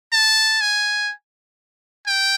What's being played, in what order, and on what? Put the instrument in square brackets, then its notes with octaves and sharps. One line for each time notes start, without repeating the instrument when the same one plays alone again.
[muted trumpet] A5
G#5
G5